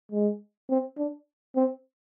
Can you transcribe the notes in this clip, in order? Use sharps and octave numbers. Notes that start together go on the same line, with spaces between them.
G#3
C4
D4
C4